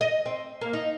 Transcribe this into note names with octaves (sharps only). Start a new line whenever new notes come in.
D#5
C4
A#3
D#4